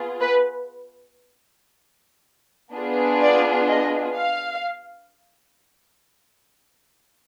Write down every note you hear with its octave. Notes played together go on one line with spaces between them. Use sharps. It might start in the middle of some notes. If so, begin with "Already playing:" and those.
Already playing: B3 F4 G#4
B4
B3 D4 F4 G#4
D5
D#5
F5